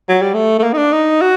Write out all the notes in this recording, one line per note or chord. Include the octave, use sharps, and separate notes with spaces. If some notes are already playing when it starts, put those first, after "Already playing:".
F#3
G3
A3
A3
A#3
D#4
D4
D#4
F#4